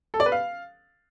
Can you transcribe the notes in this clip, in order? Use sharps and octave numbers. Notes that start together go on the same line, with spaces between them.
A4
D5
B4
F5